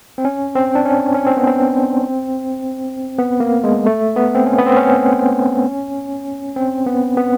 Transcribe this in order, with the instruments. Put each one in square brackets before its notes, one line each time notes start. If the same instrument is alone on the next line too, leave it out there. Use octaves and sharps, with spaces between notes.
[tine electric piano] C4
C#4
C4
D4
C#4
C#4
C4
B3
C4
B3
A#3
G#3
A3
B3
C4
C#4
B3
C4
C#4
C4
B3
B3